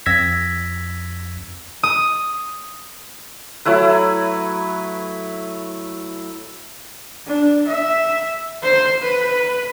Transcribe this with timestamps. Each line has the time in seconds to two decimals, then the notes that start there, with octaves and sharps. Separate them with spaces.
0.06 F2 E6 G#6 A#6 B6
1.83 D#6
3.65 F#3 A3 E4 B4
7.27 D4
7.68 E5
8.63 C5
9.02 B4